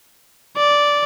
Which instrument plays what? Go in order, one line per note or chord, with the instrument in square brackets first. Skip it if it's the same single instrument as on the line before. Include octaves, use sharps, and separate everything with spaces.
[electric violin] D5